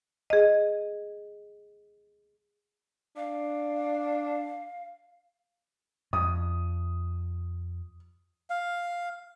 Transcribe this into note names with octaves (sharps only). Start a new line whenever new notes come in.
G#4 D#5
D4 F5
F2 D#6
F5